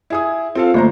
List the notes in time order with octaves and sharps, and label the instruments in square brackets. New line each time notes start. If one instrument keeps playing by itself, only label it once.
[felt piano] E4 G#4 D#6
[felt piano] C4 A4 F5 [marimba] F4
[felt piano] G1 C5 A#5 [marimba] D3 A3 A#3